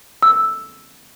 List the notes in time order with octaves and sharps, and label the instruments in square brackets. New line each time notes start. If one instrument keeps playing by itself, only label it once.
[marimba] E6